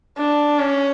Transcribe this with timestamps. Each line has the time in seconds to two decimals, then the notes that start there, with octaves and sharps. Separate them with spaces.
0.18 D4
0.60 C#4